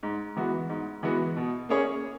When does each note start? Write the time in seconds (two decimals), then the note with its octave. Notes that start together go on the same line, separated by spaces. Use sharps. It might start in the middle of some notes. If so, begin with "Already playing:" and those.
0.03 G#2
0.36 E3 G#3 B3 F#4
0.69 G#2
1.03 E3 G#3 B3 F#4
1.37 B2
1.69 A#3 C#4 G#4 C#5